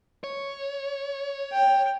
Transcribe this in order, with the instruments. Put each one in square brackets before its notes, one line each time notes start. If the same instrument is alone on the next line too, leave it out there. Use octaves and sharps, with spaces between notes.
[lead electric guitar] C#5
[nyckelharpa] G5